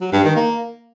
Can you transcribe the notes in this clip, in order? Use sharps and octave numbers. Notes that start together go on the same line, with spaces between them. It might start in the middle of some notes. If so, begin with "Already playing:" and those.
F#3
G2
D#3
A#3